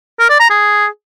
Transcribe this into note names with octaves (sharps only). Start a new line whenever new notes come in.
A#4
D5
A#5
G#4